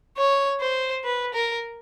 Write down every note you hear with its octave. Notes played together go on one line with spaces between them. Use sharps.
C#5
C5
B4
A#4